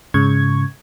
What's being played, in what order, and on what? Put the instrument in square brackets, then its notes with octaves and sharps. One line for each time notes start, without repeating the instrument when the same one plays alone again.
[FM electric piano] G#2 C#3 C#6 G#6